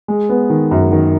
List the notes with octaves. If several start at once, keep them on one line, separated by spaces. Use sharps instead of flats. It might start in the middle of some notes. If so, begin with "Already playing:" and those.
G#3
B3
D#3
F#2
D#3